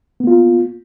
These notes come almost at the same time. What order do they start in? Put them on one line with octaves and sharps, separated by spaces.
B3 A#3 F4